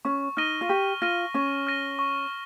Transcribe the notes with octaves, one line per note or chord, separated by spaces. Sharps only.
C#4 C#6
D#4 F6 A#6 D#7 G7
F4
G4 C#6
F4 F6 A#6 D#7 G7
C#4 C#6
F6 A#6 D#7 G7
C#6